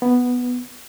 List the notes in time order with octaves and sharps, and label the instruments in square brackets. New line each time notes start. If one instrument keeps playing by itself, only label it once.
[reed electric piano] B3